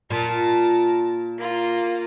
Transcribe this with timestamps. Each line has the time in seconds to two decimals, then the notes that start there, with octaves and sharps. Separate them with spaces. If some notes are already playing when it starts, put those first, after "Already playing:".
0.10 A#2 A#4 A5
1.38 A#3 F4